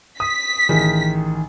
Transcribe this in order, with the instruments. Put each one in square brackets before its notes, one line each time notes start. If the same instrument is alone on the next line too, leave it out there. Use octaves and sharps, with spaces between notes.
[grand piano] D#6 [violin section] B6
[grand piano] A1 D#3 G#4